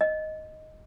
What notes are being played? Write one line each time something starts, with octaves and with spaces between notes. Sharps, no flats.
D#5